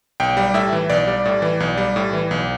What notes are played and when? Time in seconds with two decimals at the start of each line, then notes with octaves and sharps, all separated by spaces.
0.20 B1 G5
0.37 G3
0.54 A2 E5
0.73 E3
0.90 B1 D5
1.07 G3
1.25 A2
1.42 E3
1.60 B1
1.77 G3
1.96 A2
2.13 E3
2.31 B1